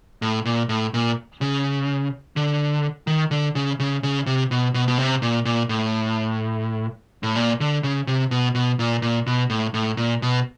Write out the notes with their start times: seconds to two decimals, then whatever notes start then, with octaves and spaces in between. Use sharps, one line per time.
0.22 A2
0.45 A#2
0.69 A2
0.94 A#2
1.41 C#3
2.36 D3
3.07 D#3
3.31 D3
3.55 C#3
3.80 C#3
4.03 C#3
4.26 C3
4.51 B2
4.74 B2
4.88 B2
4.98 C3
5.22 A#2
5.45 A#2
5.69 A2
7.23 A2
7.36 A#2
7.60 D3
7.83 C#3
8.07 C3
8.31 B2
8.55 B2
8.79 A#2
9.02 A#2
9.27 B2
9.50 A2
9.74 A2
9.97 A#2
10.22 B2